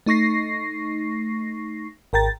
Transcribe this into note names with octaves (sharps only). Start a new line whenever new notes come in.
A3 D#4 C#6 A#6 C7
G#1 A#4 G5 A#5 A6